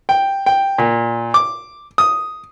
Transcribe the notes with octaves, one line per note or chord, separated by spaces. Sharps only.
G5
G5
A#2
D6
D#6